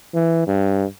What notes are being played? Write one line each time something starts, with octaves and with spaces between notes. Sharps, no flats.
E3
G2